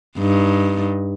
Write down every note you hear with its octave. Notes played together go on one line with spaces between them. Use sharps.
G2 D#4